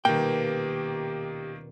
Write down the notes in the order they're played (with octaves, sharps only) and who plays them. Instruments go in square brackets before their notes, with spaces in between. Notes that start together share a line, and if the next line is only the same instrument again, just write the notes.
[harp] D#1 B2 [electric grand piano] D#3 A#3 [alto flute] G4 [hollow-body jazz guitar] G5